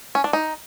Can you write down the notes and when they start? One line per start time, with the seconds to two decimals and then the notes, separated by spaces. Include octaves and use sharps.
0.15 C#4
0.24 D4
0.33 D#4